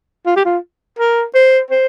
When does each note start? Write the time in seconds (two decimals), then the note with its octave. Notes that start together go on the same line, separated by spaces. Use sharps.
0.26 F4
0.36 G4
0.46 F4
0.99 A#4
1.35 C5
1.71 C5